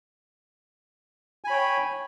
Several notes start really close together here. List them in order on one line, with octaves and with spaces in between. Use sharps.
G#5 B5 C#5 G5